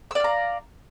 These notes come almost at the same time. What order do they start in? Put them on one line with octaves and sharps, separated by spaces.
E6 D5 F5 A#5